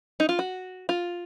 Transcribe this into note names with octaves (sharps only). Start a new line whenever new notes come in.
D#4
F4
F#4
F4